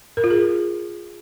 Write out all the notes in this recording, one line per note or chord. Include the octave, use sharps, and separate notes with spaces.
A#4
F4
G#4